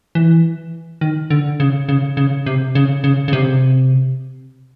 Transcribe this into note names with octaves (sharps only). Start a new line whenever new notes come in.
E3
D#3
D3
C#3
C#3
C#3
C3
C#3
C#3
C#3
C3